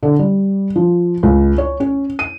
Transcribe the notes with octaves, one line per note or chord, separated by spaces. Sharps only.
D3
G3
F3
C#2
C#5
C#4
D#7